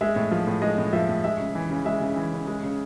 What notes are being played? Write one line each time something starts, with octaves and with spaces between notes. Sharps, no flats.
G#3 E5
A2
F3
A2
G#3 D#5
A2
F3 E5
A2
G#3 E5
C#3
E3
C#3
G#3 E5
C#3
E3
C#3
G#3
C#3